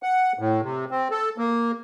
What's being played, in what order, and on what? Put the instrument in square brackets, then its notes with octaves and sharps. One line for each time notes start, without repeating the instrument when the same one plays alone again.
[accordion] F#5
A2
C3
C4
A4
A#3